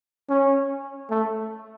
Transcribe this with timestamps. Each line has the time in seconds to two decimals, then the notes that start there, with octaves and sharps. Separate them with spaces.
0.29 C#4
1.10 A3